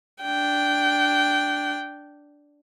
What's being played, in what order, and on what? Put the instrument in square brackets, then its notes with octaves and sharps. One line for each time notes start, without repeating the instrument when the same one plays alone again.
[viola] D4 G5